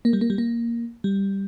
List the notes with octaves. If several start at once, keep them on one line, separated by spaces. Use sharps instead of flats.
A#3
G3
A#3
G3
A#3
G3